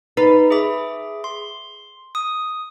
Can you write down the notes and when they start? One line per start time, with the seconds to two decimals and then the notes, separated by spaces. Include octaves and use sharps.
0.17 D#4 B4
0.50 G#4 E5 D6
1.24 C6
2.15 D#6